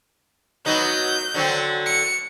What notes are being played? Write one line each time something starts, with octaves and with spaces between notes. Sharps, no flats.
F#3 B3 D#4 G6
D3 F#3 C4
C#7